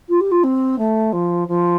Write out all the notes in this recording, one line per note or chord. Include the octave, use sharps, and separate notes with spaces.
F4
G4
F4
C4
A3
F3
F3